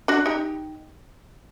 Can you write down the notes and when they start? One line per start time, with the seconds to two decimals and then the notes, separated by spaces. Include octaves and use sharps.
0.08 D4 F#4
0.26 D#4 G4